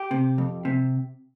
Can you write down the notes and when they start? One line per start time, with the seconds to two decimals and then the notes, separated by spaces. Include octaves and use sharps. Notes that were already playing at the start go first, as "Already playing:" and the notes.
Already playing: G4
0.11 C3
0.38 F2
0.65 C3